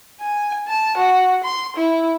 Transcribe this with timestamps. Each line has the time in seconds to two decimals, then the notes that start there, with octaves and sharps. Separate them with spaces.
0.21 G#5
0.68 A5
0.98 F#4
1.44 C6
1.77 E4